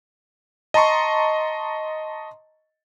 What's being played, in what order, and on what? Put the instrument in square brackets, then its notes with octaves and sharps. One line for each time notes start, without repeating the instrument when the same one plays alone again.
[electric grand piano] D#5 A5 A#5 C6 C#6